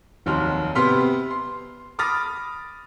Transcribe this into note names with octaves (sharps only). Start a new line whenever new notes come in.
F1 D#2 F#3 C6 F6
C3 B3 C6 F6 B6
C6
B5 D6 D#6 F6 A6 A#6